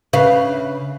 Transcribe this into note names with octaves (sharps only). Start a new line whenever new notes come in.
C#3 B4 F5